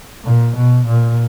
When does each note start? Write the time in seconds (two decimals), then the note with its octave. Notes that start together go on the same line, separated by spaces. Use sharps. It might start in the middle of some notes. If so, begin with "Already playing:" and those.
0.24 A#2
0.56 B2
0.86 A#2